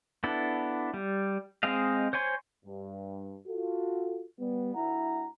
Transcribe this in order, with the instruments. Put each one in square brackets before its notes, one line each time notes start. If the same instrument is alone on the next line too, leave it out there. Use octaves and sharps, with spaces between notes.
[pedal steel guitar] B3 D4 E4 A4
G3
G#3 C4 G#4 D#5 F5
C5 C#5 G#5 C6
[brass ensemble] G2
F4 F#4 A4
G3 B3
D2 E4 F#5 A#5